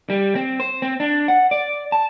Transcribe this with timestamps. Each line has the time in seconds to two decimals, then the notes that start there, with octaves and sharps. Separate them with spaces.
0.10 G3
0.35 C4
0.60 C5
0.82 C4
1.00 D4
1.28 F#5
1.51 D5
1.92 A5